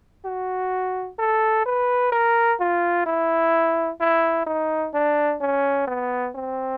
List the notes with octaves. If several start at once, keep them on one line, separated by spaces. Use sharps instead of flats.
F#4
A4
B4
A#4
F4
E4
E4
D#4
D4
C#4
B3
C4